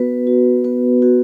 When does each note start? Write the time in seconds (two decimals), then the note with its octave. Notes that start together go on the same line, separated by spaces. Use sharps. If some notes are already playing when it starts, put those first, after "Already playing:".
Already playing: B3 F#4 B4
0.27 F#4
0.64 B3 B4
1.02 F#4